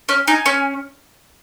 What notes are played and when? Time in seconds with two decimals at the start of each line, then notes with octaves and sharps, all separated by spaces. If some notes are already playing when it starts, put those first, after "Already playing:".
0.09 C#4
0.27 D#4 G#5
0.46 C#4